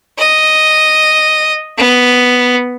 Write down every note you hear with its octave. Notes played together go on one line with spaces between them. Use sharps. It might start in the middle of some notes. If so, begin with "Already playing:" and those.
D#5
B3